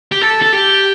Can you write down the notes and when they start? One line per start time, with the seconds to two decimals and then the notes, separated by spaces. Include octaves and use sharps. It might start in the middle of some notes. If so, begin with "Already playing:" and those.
0.12 G4
0.21 A4
0.42 A4
0.53 G4